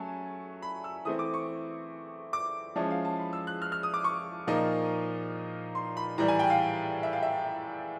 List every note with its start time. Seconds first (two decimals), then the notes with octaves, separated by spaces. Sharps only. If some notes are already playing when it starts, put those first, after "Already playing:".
Already playing: F#3 A3 C#4 G#5 A5
0.62 B5
0.84 E6
1.05 E3 A3 C4 E4 D#6
1.19 D6
1.34 C#6
2.33 D6
2.76 F3 G#3 C#4 E4 A5
2.90 F5
3.05 A5
3.19 B5
3.33 E6
3.47 F#6
3.62 F6
3.72 F6
3.83 D#6
3.94 D6
4.04 C#6
4.47 A#2 F3 A#3 D#4
5.75 C6
5.97 B5
6.18 A2 E3 G3 A#5
6.28 G#5
6.39 G5
6.50 F5
7.03 E5
7.13 F5
7.23 E5